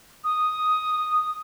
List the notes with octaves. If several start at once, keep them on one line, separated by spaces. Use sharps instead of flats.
D#6